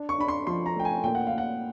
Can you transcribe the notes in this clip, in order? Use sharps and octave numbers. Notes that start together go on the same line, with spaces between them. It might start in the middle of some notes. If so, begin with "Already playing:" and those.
Already playing: D4
C#6
D4 B5
C6
F3 C6
A#5
A3 G5
G#5
A#2 G5
F#5
F5
A#2
F#5